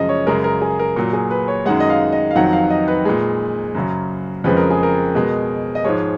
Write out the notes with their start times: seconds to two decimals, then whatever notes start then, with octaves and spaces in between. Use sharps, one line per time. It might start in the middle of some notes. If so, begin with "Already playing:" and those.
Already playing: F#2 C#3 F3 G#3 D#5
0.09 C#5
0.27 F#2 C#3 G#3 A#4
0.44 A#4
0.61 G#4
0.79 A#4
0.96 A#2 F#3
1.13 G#4
1.31 B4
1.48 C#5
1.66 F#2 D#3 G#3 F#5
1.80 D#5
1.90 F5
2.13 D#5
2.31 F5
2.36 F2 D#3 F#3 F#5
2.53 F5
2.70 D#5
2.88 B4
3.05 A#2 G#3
3.75 F#2 C#3 F#3
4.44 F2 C#3 F3 G#3 B4
4.57 A#4
4.70 G#4
4.83 A#4
5.15 B2 G#3
5.75 D#5
5.84 G#2 F3 G#3 C#5